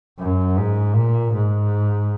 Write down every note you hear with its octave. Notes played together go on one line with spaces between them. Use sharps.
F#2
G#2
A#2
G#2